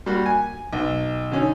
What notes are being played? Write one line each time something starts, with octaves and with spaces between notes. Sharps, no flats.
G3 A#3 F#4
G#5
B1
D3 C#4 D#4